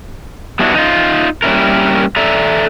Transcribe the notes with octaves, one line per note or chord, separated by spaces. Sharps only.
G3 B3 D4 E4 F#4
D#4 F4
G3 A#3 C#4 E4 A#4
A4 D5 E5 A#5